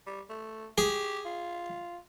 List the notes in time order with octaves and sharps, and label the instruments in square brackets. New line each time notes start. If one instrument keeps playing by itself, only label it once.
[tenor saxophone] G3
A3
[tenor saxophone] G4 [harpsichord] G#4
[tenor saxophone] F4